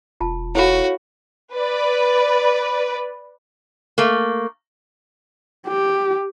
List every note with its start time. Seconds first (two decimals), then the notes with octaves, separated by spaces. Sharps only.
0.20 E1 F4 A5
0.55 E4 F#4 A4 C#5 F5 B5
1.53 B4 D5
3.98 A3 A#3
5.68 G4